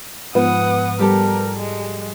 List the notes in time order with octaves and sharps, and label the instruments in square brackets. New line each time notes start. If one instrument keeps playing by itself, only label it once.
[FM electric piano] G#2 F3 [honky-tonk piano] B3 [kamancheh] F#5 D#6
[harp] G3 G4 A4 [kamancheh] A#4
[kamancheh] G#3